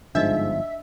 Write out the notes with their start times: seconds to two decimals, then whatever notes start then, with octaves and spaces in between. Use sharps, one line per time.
0.15 G1 G#2 F3 D4 D#5 E5